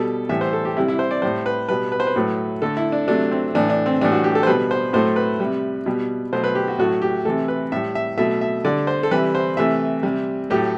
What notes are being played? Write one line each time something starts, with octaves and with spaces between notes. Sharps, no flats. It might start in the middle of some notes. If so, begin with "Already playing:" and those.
Already playing: B2 G3 A4
A2 E3 G3 E5
C5
A4
G4
C3 G3 E4
E4
C5
D5
A2 G3 C5
B4
B2 G3 B4
B4
C5
B4
A2 F#3 A3
D3 A3 A4
E4
D4
C3 F#3 A3 D4
C4
A2 E3 A3 D4
D4
C4
A2 E3 G3 D4
F#4
G4
A4
C5
B2 G3 B4
C5
A2 F#3 A3 C5
B4
C3 G3
B2 G3
B2 F#3 A3 C5
B4
G4
F#4
A2 F#3 A3 F#4
G4
C3 E3 A3 A4
B4
A2 G3 E5
E5
B2 F#3 A3 E5
E5
D3 G3 D5
C5
A4
C3 E3 G3 B4
C5
C3 E3 A3 E5
C3 G3
A2 F#3 A3 G4